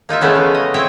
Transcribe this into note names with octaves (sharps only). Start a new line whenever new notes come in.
A#3 D#4 F4 E5
C#3 E3 G#3 A3 B3 C#4
F5
D#5
C4 E4 C#5 G5